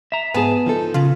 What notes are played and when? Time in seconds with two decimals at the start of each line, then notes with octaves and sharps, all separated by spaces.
0.12 E5 A#5
0.34 G#2 B3 G#4 G#5 A5
0.66 F3 D#4 A4
0.94 A#2 C#3 F4